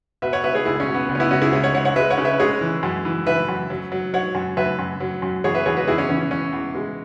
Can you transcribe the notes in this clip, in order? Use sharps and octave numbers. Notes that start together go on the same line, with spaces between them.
B2 B4 E5
C#5 F#5
B2 B4 E5
G#4 C#5
C#2 E4 G#4
C#4
B2
B3
C#2 B3
C#4
B3 E4
C#2 C#4 F#4
E4 G#4
C#2 G#4 C#5
C#5 F#5
C#2 C#5 F#5
C#5 F#5
G#3 B4 E5
C#5 F#5
C#3
B4 E5
G#3 G#4 C#5
E3
F#2
E3
E3 B4 E5
F#2
F#3
F#3
F#3 C#5 F#5
F#2
F#2 B4 E5
F#2
F#3
F#2
E2 G#4 C#5
B4 E5
E2 G#4 C#5
F#4 B4
E2 E4 G#4
C#4
E3 C#4
C#4
E3 C#4
E2
G#3